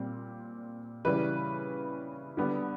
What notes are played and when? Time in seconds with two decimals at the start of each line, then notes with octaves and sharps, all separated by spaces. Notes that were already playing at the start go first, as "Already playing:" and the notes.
Already playing: A#2 G3 C4
1.05 C#3 E3 G3 B4
2.37 D3 G3 B3